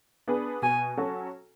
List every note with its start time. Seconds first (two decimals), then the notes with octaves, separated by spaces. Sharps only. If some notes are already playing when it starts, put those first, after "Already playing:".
0.27 B3 D4 G#4 B4
0.62 B2 G#5
0.97 F#3 C#4 F#4 A4